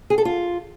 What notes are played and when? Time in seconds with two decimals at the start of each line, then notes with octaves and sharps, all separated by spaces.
0.10 G#4
0.18 A4
0.25 F4